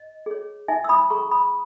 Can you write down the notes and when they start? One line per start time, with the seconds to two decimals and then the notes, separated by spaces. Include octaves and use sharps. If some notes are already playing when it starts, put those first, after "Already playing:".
Already playing: D#5
0.26 G#4 C#5
0.68 D#4 E5 G#5
0.84 E6
0.89 B5 D#6
1.10 G#4 C#5 A#5 C#6
1.31 B5 D#6